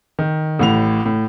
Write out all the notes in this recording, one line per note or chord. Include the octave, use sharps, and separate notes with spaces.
D#3
A1 A2 F7
A2